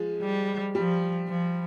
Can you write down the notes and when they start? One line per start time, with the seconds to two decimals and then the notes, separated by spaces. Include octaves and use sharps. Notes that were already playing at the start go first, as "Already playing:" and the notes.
Already playing: F3 G#3
0.22 G3
0.75 F3 G3
1.28 F3